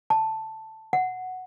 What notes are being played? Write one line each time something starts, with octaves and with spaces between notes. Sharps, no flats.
A5
F#5